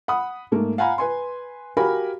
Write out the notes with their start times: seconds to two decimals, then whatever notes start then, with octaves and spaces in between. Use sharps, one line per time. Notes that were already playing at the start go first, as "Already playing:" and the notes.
0.08 F#5 B5 D#6
0.52 G#2 A3 A#3
0.78 F5 F#5 G#5 A#5 B5
0.98 B4 G#5 C6
1.77 F#4 G4 A#4 F5 G#5 B5